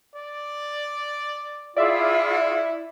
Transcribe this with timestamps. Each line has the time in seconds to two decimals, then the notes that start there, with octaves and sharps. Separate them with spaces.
0.16 D5
1.77 E4 F4 G#4 D5 E5 G5